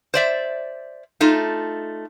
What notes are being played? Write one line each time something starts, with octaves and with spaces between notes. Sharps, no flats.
C5 D5 E5
A3 D#4 F4 A4